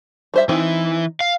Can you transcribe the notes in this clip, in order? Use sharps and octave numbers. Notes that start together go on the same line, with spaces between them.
G3 C5 E5
E3 C4 D#4
F5